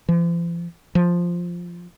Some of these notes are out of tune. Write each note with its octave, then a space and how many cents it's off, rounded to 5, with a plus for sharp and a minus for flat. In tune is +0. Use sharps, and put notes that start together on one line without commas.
F3 -45
F3 +0